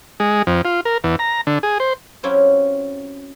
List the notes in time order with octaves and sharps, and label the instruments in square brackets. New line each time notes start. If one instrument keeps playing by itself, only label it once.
[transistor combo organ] G#3
F2
F4
A#4
E2
A#5
D3
G#4
C5
[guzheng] F#3 C4 C#4 E4 F4 G4